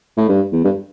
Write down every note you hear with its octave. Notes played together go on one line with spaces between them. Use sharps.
A2
G2
E2
G2